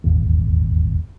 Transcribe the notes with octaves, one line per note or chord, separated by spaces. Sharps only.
D#1 G#1 E2